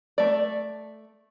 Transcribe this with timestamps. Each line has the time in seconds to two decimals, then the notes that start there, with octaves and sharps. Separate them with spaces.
0.18 A3 D5